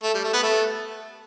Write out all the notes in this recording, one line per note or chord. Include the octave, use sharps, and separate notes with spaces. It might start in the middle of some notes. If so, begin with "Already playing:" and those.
A3
G3
A3
B3
A3